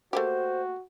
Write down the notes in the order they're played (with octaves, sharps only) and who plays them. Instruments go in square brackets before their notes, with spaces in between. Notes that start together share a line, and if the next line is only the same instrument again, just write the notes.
[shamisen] A3 A#3 G4 [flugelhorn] F#4 [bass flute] C5